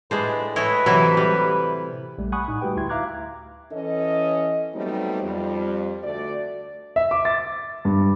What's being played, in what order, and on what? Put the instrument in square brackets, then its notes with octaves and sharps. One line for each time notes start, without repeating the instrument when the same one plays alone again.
[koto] A2 [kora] G#3 D4 C5 [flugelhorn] B4
[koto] A2 E4 [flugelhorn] B4 [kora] C#5 D#5
[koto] C3 E3 E4 [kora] F#3
[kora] G3
[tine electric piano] A#1 G3 A3
F#5 G#5 B5 C#6 D#6 F#6
A2 D#4
G3 A3 F#4 G4 B4 G5
D2 E4 C6 G#6
E5 F5 A#5 D6 F#6 G#6
[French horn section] E3 C#4 A4 D#5
F#3 G3 A3 B3 C4 D#4
F2 G3
D2 A3 F#4 D5
[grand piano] E5
D6
A6
G2